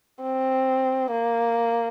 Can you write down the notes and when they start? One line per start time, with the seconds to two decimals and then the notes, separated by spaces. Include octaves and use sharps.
0.23 C4
1.11 A#3